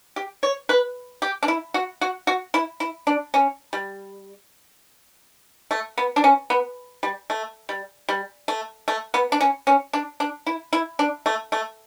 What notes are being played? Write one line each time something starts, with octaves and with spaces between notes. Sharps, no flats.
G4
C#5
B4
G4
D4
E4
F#4
F#4
F#4
E4
E4
D4
C#4
G3
A3
B3
D4
C#4
B3
G3
A3
G3
G3
A3
A3
B3
D4
C#4
C#4
D4
D4
E4
E4
D4
A3
A3